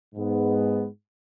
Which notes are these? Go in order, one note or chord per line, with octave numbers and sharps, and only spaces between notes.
G#2 G#3 B3